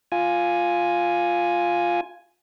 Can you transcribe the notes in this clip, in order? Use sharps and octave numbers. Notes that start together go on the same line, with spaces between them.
F4 G#5